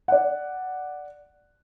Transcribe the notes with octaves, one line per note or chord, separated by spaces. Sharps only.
D5 F#5